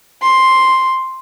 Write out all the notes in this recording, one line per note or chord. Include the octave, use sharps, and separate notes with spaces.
C6